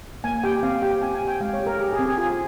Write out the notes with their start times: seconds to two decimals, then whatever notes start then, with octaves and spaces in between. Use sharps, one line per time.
0.24 A#3 G#5
0.44 G4 G5
0.63 C4 F5
0.82 G4 G5
1.02 C4 G#5
1.15 G#5
1.21 G4
1.27 G5
1.41 G#3 F5
1.54 C#5
1.60 G4
1.66 A#4
1.79 G4 G#4
1.93 G#4
1.99 C4
2.06 G#4
2.18 F4 G#4